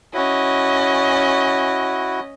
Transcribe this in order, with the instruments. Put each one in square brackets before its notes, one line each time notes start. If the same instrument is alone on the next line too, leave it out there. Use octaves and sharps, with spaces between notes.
[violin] C#4 D#5 [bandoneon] E4 F#4